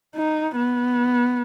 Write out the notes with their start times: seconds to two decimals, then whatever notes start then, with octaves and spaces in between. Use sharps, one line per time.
0.16 D#4
0.57 B3